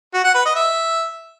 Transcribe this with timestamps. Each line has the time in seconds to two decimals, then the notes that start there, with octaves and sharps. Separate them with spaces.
0.14 F#4
0.24 F#5
0.35 B4
0.45 D#5
0.56 E5